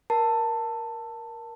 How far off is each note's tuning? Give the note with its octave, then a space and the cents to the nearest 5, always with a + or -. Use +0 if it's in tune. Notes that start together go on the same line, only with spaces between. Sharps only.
A#4 +15 A5 +15